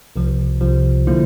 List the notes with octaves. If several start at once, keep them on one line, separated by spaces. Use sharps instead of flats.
C2 C3 F3
C2 C3 F3
D3 F3 A#3 E4